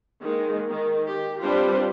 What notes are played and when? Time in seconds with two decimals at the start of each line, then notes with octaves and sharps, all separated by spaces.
0.21 D#3 G#3 A#3
0.69 D#3
1.09 G4
1.42 G3 C4 D4 F4 B4 C5